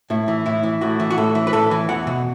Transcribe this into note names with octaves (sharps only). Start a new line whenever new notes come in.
A2 E4
E3
A2 E4
E3
A2 F#4
E3
F#4
A2 A4
E3
B4
A2 A4
E3
E2 F#5
B2